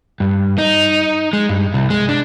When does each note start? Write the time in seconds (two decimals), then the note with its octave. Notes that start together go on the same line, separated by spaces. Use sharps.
0.20 G2
0.58 D#4
1.33 G#3
1.49 G2
1.74 C2
1.90 G#3
2.09 D4